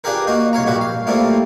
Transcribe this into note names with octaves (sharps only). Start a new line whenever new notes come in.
D4 F4 G4 G#4 A#4 B4
A#3 D#4 F#4
C2 C#5 F5 A#5
A#1 G2 F#4 G4 B5
F5
G3 A3 A#3 C4 E4 F4